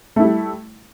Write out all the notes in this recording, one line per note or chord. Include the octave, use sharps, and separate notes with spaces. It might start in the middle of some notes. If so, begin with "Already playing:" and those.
G3 A3 E4